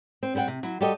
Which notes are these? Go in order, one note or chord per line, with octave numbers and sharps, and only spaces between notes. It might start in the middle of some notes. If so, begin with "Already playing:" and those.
C4
G3 C4 A#4 F#5 G5
C3
F#3 E4
G3 F#4 G4 A4 D#5